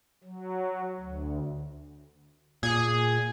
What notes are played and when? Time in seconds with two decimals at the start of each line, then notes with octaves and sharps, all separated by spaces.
0.24 F#3
1.00 D2
2.63 A#2 G#4